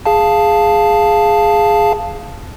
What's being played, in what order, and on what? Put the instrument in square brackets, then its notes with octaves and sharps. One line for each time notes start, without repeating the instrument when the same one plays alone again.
[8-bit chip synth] G#4 F5 A5